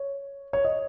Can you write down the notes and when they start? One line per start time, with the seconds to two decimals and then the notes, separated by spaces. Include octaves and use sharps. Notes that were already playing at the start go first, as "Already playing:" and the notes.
Already playing: C#5
0.53 C#5
0.65 D#5